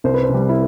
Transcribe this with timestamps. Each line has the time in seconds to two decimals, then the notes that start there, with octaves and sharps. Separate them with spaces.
0.04 C2 C5
0.14 B4
0.23 C5
0.29 C3 G3
0.49 E4